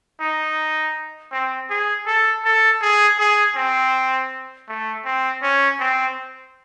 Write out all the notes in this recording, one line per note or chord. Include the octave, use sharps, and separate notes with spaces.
D#4
C4
G#4
A4
A4
G#4
G#4
C4
A3
C4
C#4
C4